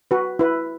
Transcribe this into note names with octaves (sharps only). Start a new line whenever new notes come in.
F#4 B4
E4 B4